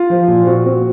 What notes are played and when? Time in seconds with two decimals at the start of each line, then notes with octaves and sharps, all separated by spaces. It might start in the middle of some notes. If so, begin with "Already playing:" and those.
Already playing: F4
0.10 F3
0.28 A#2
0.47 C4 F#4
0.66 C4